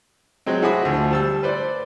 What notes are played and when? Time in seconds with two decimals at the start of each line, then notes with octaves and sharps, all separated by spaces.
0.46 F#3 G#3 C4
0.62 E4 F#4 G#4 B5 D#6
0.85 D2 F3
1.11 G3 A5 E6
1.43 B4 C5 D5